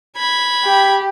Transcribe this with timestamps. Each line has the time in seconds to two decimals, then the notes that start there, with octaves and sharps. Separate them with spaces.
0.17 B5 G#6
0.64 G4